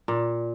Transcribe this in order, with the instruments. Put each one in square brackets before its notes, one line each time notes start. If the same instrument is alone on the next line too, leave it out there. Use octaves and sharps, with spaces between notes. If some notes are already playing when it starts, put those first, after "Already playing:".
[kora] A#2